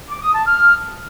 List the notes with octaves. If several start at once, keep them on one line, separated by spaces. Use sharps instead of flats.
D6
D#6
A5
F6